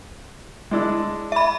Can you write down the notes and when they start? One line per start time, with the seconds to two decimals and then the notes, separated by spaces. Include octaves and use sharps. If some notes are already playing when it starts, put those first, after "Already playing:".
0.71 G#3 D4 E4
1.32 E5 B5